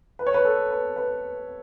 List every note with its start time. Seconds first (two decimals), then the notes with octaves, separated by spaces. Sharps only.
0.19 B4
0.27 C#5
0.34 B4
0.45 A4
0.71 B4
0.96 B4